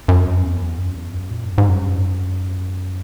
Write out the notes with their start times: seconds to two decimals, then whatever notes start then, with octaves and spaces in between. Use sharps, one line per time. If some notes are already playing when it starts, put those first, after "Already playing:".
0.08 F#2
0.43 E2
0.78 F#2
0.95 E2
1.13 F#2
1.30 A#2
1.48 F#2
1.58 G#2
1.68 F#2